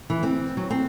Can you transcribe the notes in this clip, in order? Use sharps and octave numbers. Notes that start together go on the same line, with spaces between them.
E3
C4
F#3
C4